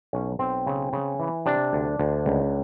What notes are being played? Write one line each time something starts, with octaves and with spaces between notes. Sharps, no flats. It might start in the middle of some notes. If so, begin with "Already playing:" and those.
B1 C#4
B1 C4
C#3
C#3
E3
C3 D4
D2
D2
C#2